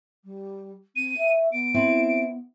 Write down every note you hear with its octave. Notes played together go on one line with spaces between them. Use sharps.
G3
C4 D#7
E5
B3 D7
C4 E4